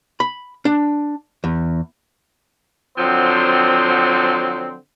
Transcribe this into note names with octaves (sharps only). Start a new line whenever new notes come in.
B5
D4
E2
D3 F3 F#3 C4